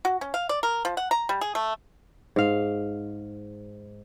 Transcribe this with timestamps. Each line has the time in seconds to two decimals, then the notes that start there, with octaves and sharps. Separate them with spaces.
0.05 F#4
0.21 C#4
0.34 F5
0.49 D5
0.63 A#4
0.85 F3
0.97 F#5
1.11 A#5
1.29 G3
1.41 G#4
1.55 A3
2.36 G#2 F5